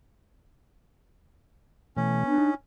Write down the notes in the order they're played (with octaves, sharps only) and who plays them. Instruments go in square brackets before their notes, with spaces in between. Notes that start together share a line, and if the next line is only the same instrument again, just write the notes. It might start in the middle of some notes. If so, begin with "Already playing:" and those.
[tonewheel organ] B2 E3 A3 [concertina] C#4
[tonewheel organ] B3 [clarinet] D4
[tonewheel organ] D#4